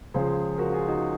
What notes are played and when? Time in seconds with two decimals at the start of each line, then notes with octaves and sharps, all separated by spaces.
0.14 C#2 C#3 F3 G#4 C5
0.58 F#4 A#4
0.73 F4 G#4
0.88 D#4 F#4